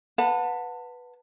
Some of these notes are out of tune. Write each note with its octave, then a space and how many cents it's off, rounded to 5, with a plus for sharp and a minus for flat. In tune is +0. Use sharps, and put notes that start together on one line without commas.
B4 +0 F#5 -25 A5 +25